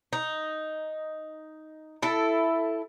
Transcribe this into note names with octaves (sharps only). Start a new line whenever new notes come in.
D#4
E4 A4